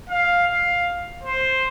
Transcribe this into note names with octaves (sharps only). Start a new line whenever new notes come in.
F5
F5
C5